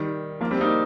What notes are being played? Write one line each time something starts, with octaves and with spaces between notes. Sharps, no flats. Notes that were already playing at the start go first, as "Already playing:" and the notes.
Already playing: D#3 G3
F3 A#3
G3 C4
A#3 D#4